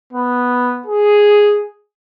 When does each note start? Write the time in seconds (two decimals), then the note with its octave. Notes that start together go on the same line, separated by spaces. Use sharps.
0.13 B3
0.86 G#4